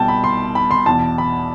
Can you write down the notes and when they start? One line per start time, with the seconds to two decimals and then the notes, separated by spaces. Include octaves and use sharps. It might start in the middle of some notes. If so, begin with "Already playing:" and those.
Already playing: C2 B2 G5 A5
0.08 B5
0.24 C6
0.55 B5
0.71 C6
0.86 E2 B2 A5
1.18 B5